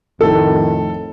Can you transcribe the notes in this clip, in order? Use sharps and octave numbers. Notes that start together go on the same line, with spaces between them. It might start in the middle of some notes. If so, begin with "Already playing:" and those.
F2 A2 D#3 A4